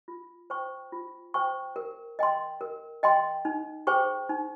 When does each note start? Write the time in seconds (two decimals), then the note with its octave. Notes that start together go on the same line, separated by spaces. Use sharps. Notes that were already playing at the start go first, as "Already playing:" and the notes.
0.08 F4
0.50 C5 G5 C#6
0.92 F4
1.34 C5 G5 C#6
1.76 A#4
2.19 D#5 G5 C6
2.61 A#4
3.03 D#5 G5 C6
3.45 D#4
3.87 G#4 C5 G5 C#6
4.29 D#4